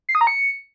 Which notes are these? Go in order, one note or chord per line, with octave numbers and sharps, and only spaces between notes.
C7
D#6
A#5
C#7